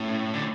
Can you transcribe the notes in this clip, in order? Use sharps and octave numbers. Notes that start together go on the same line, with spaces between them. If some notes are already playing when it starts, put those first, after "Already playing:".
Already playing: A2 C#4 E4
D3